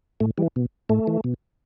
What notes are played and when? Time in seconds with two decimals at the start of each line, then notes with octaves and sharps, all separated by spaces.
0.20 A2 A3
0.38 E3 G3
0.56 B2
0.89 A2 A3
1.07 E3
1.24 B2